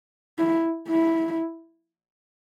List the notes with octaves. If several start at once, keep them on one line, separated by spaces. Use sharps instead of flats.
E4
E4